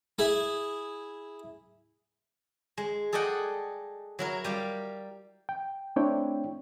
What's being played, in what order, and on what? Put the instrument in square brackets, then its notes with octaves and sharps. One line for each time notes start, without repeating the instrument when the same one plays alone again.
[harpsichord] E4 G#4 E5
[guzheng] G#3
G#4 A4 D5 D#5 F#5 G5
F#3 E4 A#4
G3 D5 F5
[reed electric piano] G5
A3 C4 D4 E4 C#5 G5